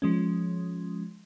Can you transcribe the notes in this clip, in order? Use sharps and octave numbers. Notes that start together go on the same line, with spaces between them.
F3 G#3 C#4